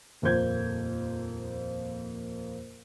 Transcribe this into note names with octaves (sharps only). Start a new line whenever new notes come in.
D#1 F2 A#3 C5 G6 G#6